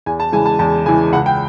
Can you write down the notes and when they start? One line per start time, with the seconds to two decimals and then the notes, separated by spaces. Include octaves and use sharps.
0.06 E2 G#5
0.20 A5
0.32 C#3 E3 G#3 G#5
0.46 A5
0.59 E2 A5
0.86 C#3 E3 G#3 G#5
1.13 C#2 F#5
1.26 G5